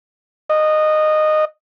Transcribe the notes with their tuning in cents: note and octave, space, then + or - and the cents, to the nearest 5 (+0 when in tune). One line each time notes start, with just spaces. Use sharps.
D#5 -15